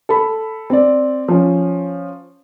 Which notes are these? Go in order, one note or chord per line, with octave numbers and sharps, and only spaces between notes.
A4 B5
C4 D5
F3 C#4